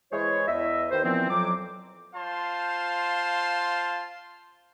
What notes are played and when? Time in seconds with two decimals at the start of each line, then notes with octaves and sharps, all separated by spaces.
0.12 E3 G#3 E4 C5 C#5
0.47 E2 D#5 E5
0.91 D#2 B4 C5
1.04 A#2 E3 F3 B3 C4
1.29 F2 F3 F#3 D6
2.15 F4 C5 F5 A5 C6